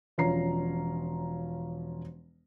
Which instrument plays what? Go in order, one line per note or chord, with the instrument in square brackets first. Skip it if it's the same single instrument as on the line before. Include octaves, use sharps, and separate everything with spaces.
[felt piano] E1 F3 C#4 A#5 C7